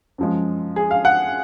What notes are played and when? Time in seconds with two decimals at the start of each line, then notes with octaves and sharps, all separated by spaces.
0.18 F#2 F3 G#3
0.76 G#4
0.91 F5
1.05 F#5